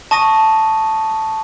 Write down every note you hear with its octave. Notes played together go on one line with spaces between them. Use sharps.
A5 C#6 D#6 A#6 D#7